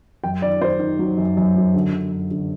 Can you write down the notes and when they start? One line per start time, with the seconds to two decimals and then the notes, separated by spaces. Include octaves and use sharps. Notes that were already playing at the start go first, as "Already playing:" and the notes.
0.24 F#2 G5
0.42 D#3 D5
0.61 D#3 C5
0.79 D#3
0.99 F#3
1.17 F#2
1.37 F#2
1.55 F#3
1.74 D3
1.92 D3
2.12 F#2
2.31 D3